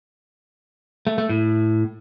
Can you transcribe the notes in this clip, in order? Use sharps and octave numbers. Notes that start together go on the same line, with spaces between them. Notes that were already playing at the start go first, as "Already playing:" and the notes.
A3
A3
A2